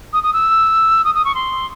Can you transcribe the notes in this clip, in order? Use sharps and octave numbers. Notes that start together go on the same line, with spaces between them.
D#6
D#6
E6
D#6
D#6
C#6
C6